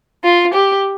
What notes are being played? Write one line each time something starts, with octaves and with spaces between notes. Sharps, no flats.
F4
G4